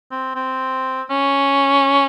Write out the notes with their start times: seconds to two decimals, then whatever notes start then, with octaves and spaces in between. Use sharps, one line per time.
0.11 C4
0.35 C4
1.10 C#4